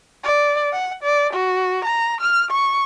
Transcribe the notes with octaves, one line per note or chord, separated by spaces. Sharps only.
D5
F#5
D5
F#4
A#5
F6
C#6